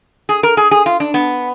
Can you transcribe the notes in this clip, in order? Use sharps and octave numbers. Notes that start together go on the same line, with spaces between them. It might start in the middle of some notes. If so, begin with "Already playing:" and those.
G#4
A#4
G#4
G#4
F4
D4
B3